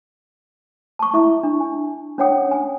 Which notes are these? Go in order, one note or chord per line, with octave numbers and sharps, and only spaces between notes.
A5 C#6
E4 E5 C#6
D4
G#5
C#4 D4 C#5 F#5 G5 D#6
G#5